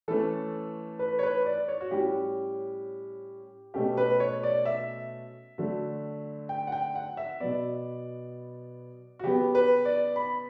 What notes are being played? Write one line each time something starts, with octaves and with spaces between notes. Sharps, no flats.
E3 A3 C#4 A4
B4
C#5
B4
D5
C#5
F#4
A2 G3 C#4 G4
B2 A3 C#4 G4
B4
C#5
D5
E5
D3 F#3 A3
G5
F#5
G5
F#5
E5
B2 F#3 B3 D5
F#4
C#3 F#3 B3 G4
B4
D5
B5